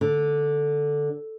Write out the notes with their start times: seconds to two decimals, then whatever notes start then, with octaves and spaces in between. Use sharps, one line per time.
0.01 D3